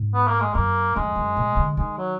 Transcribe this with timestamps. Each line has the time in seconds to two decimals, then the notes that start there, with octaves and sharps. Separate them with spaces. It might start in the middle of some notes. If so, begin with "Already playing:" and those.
Already playing: G#2
0.14 B3
0.27 A#3
0.40 G#3
0.54 F#2 A#3
0.96 F2 G#3
1.16 F#2
1.37 A#2
1.56 D3
1.76 D#3 G#3
1.97 F#3